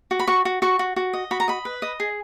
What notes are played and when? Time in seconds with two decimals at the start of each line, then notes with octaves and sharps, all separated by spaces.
0.11 F#4
0.19 B5
0.27 F#4 C#6
0.45 F#4
0.62 F#4 C#6
0.79 F#4
0.96 F#4
1.13 D#5
1.31 F#4 B5
1.40 A#5
1.48 D#5 B5
1.65 B4
1.82 D#5
2.00 G#4